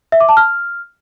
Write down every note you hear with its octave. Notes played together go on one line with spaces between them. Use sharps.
E5
D6
A5
F6